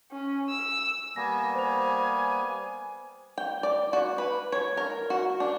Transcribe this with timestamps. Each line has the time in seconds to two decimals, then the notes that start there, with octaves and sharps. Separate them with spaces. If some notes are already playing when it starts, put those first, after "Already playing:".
0.12 C#4
0.50 E6
1.16 G3 A#3 B3 G#5 A#6
1.55 C5 G#5 F7
3.38 G5
3.63 D5
3.93 F#4
4.18 B4
4.52 C#5
4.77 A#4
5.10 F#4
5.40 D4